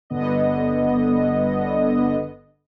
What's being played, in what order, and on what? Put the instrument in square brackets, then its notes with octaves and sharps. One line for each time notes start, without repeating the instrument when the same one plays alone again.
[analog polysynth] G1 D3 B3 D#5